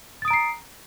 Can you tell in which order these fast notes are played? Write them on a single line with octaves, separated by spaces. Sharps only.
A6 D#6 D7 A#5 C7